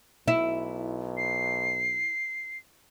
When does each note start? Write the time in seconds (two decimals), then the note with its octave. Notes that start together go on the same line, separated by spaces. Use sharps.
0.28 B1 E4
1.17 C7